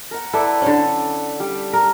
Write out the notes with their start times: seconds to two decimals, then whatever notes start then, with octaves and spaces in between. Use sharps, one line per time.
0.11 A#4 F#5
0.33 E4 A4 B4 D5
0.62 D3 C#4
1.40 G3
1.73 A#4